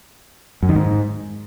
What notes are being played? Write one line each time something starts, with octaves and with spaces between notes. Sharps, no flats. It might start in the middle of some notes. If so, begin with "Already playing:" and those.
F#2
D#3
G#2